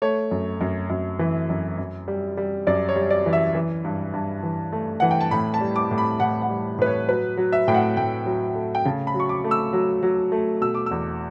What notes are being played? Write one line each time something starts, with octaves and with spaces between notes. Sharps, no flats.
A3 C#5
F#2
F#2
F#2
E3
F#2
F#2
G3
G3
F#2 D5
C#5
G3
D5
E3
E5
E3
G2
G2
E3
A3
E3 F#5
G5
A5
A2 B5
A5
G3
D6
A2
B5
A2 F#5
F#5
G3
A2 B4
C#5
F#3 B4
F#3
E5
A2 G5
F#5
A2 G5
F#3
A3
G5
C#3 A5
B5
F#3
C#6
D6
A3
E6
F#3
F#3
A3
B2 E6
D6
E2 E6